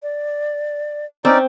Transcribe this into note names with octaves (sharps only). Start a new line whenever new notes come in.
D5
C4 C#4 D#4 D5